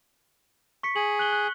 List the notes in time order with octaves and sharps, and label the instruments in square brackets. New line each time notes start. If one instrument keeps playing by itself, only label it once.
[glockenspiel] C#6 B6 C#7
[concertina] G#4 [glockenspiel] F#7
[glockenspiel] F#6 F#7 G7
F#6